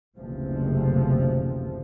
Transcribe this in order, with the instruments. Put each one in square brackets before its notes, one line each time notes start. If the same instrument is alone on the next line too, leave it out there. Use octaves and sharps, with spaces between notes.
[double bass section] F#1 D2 C3 E3 F3